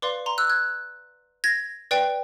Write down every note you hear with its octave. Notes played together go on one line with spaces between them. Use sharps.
B4 D5 F5 C6 D6
A#5 C6
E6 F#6
F#6 G#6
G#6 A#6
B4 D5 G5